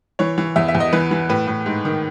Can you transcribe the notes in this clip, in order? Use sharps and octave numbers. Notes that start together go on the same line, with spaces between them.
E3 C#5
E3
E2 E5
E5
E2
D#5
E3 B4
E3
A2 B4
A2
G#2
D#3